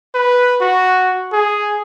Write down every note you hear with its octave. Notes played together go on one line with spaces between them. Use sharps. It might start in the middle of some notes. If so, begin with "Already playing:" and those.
B4
F#4
G#4